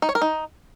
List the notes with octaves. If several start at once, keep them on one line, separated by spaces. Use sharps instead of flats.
D#4
C#5
A#4
D#4